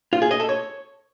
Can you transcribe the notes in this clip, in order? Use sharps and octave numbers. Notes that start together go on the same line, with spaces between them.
F4
G#4
D#5
A4
C#5